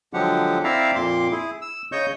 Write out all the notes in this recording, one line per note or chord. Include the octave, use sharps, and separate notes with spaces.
D3 F3 F#3 G#3 G4 F#5
C4 E4 D5 E5 F5 A#5
F2 A#2 C6 D6
E4 G#4
E6
C#3 C#5 D#5 C#6 G6